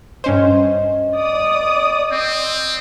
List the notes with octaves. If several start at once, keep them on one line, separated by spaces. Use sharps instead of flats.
G2 C#4 C5 D#5
D5 D#6
C4